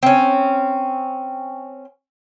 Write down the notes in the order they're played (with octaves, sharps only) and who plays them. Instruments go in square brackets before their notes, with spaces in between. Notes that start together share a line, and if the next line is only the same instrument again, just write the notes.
[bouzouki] C4 C#4